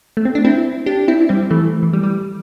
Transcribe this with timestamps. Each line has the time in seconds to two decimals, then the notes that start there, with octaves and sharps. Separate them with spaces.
0.17 A3
0.25 C4
0.35 D4
0.45 C4 E4
0.86 D4 G4
1.08 C4 E4
1.29 G3 C4
1.50 E3 A3
1.83 E3
1.93 G3
2.03 G3